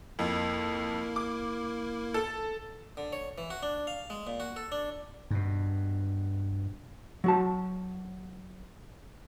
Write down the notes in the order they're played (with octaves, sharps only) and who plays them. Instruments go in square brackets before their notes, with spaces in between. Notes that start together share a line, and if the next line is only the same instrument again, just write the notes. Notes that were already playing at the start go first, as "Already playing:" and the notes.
[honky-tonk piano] F2 [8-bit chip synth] A#3 E4 A#4
[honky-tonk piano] D6
A4
[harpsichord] D3
C#5
E3
F#4
D4
F5
G#3
A#2
F#4
A4
D4
[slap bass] G2 B2
[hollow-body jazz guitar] F#3 F#4 A5